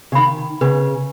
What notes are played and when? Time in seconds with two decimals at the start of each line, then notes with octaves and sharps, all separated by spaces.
0.12 C#3
0.15 D#3 B5
0.61 C#3 B4